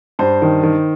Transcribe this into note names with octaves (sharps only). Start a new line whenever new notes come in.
G2 C5
D#3
D#3